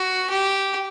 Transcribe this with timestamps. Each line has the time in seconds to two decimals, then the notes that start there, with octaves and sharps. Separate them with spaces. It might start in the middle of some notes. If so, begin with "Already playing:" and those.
Already playing: F#4
0.30 G4